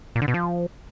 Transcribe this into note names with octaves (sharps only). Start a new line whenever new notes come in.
A#2
D3
B2
F3